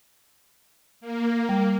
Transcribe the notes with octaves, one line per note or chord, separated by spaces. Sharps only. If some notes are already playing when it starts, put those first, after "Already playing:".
A#3
G3